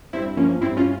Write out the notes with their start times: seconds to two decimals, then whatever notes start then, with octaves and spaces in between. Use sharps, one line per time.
0.13 G2 C4 E4
0.37 F3 A#3 C#4
0.61 G2 C4 E4
0.77 C#4 F4